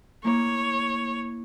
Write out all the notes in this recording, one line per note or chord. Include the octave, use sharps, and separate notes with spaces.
A#3 E4 C#5